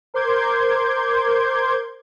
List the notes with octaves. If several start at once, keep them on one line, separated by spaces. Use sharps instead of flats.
A#4 C5 C6 D6 G6 G#6